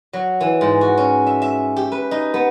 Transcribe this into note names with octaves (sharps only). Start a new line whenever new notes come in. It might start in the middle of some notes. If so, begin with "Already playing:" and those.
F#3
E3
G#2
F#4
C#4
E5
E5
G4
B4
D#4
B3